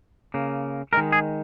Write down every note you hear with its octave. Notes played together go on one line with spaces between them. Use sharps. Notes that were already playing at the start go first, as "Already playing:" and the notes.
C#3 A#3
D#3 G#3 A#4
G#4